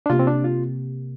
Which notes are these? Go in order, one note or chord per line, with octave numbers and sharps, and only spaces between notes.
D4
C3 A#3 F4 G4
C4
D4
F4